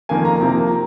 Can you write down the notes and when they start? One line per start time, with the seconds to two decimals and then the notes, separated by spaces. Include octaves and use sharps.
0.09 F2 D#3 A#3 G#5
0.25 A#5
0.40 C3 F3 A#3 A#5